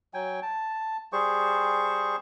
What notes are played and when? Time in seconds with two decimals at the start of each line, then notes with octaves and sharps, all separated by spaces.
0.14 F#3 G5 G#5
0.42 A5
1.13 G3 G#4 C5 C#6